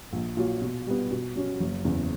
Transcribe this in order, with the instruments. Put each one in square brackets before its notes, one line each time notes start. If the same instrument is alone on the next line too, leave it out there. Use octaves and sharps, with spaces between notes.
[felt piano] A#1
A#2 F#3
B2
G3 B3
B2
F#3 C#4
F#1
E2 C#3